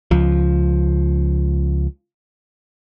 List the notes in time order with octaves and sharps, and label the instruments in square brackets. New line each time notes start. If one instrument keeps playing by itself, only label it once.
[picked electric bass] C#2 F3